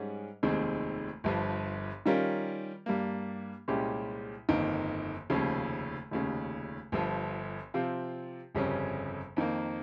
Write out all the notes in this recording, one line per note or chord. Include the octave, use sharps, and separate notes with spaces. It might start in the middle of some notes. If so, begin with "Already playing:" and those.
Already playing: G#2 G3 C#4 G#4
F1 D#2 D#3 G#3 C4
G1 G2 F3
D#3 G3 C#4 F4 A#4
G2 G3 A#3
C2 A#2 G#3 C#4 G4
G1 F2 D#3 A#3
F1 D#2 C#3 F3
F1 D#2 C#3
G1 G2 F3
C3 F3 C4 F4
G1 F2 C#3 G3 C#4
F2 D#3 A#3